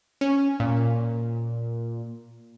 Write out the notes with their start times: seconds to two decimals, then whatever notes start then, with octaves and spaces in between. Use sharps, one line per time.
0.21 C#4
0.60 A#2